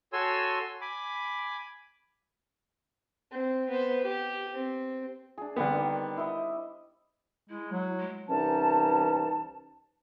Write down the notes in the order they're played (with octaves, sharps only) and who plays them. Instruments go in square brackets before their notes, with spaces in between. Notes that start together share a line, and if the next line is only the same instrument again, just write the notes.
[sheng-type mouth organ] F#4 A4 C#5 G#5 C6 E6
G#5 B5 D6
[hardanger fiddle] C4
B3 C5
G4
C4
[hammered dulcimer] D4 G#4
[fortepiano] D3 B3 [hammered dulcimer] G3 C4
[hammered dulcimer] D#3 C5 D6
E4 D#5
[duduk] G#3 [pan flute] E4
[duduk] F#3
[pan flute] G#3
[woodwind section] C2 E3 C#4 D#4 A5